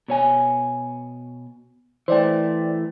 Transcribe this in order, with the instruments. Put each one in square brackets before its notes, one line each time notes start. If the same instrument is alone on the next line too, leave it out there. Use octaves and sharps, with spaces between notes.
[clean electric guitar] B2 C#5 G#5
[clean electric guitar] E3 A3 [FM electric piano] C5 D5 G5